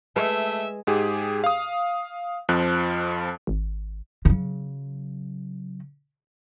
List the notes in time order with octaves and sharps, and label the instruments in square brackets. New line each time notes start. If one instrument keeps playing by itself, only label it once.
[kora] G#3 [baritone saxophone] A3 [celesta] B4 [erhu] E5
[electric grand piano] G#2 G4 G#4
F5 D#6
F2 F3 F#6
[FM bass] G#1
[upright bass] C#3 F#3